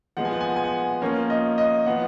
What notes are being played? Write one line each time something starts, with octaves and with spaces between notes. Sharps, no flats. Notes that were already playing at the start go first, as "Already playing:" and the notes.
F3 G#3 B3 F#5
G#5
F#5
G#5
F#5
G#5
F#5
F3 A#3 C#4
D#5
D#5
F3 B3 F#5